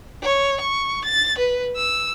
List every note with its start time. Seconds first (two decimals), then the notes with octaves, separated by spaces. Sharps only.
0.22 C#5
0.61 C#6
1.04 A6
1.38 B4
1.76 E6